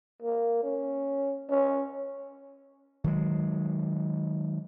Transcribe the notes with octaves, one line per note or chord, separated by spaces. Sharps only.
A#3
C#4
C#4
D#3 F#3 G#3